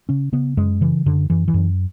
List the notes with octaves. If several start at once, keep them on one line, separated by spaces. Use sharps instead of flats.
C#3 C#4
C#3 B3
F#2 G#3
C#3 E3
F#2 D3
F#2 E3
E3
F#2